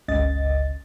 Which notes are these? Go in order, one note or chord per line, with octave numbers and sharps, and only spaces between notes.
G1 C#2 C#3 D#5 A6